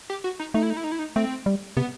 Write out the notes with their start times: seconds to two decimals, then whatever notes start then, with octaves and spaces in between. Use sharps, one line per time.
0.10 G4
0.24 F#4
0.40 D#4
0.54 A3 D#4
0.63 E4
0.70 D#4
0.77 E4
0.84 D#4
0.92 E4
0.99 D#4
1.16 A3 C4
1.46 G3
1.77 C3 B3